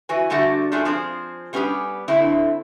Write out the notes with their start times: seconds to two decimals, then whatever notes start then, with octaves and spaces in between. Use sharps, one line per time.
0.09 E3 F#4 B4 G#5
0.30 D3 G3 A3 F#4 F#5
0.72 A3 D4 F4 F#4 G#4
0.85 F3 C4 G#4 C5
1.53 G3 B3 C#4 F4 G4 G#4
2.08 D3 A3 C4 E4